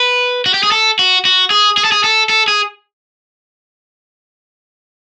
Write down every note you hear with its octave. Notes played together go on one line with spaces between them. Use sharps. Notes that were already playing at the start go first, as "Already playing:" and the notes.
Already playing: B4
F#4
G4
G#4
A4
F#4
F#4
G#4
G#4
A4
G#4
A4
A4
G#4